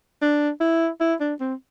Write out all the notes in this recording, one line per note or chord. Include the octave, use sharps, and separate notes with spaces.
D4
E4
E4
D4
C4